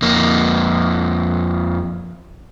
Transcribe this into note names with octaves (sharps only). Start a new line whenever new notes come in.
F2 A#3